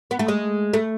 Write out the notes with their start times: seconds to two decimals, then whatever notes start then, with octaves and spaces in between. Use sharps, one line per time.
0.11 B3
0.19 A3
0.28 G#3
0.73 A3